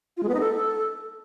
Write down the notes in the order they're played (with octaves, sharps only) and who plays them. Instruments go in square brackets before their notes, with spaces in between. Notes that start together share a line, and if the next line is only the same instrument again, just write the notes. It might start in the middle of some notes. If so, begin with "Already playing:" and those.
[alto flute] F4
G#3
B3
D#4
A4